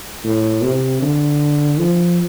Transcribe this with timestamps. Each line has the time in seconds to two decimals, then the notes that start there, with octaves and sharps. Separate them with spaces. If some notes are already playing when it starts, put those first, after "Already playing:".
0.25 A2
0.63 C3
1.02 D3
1.79 F3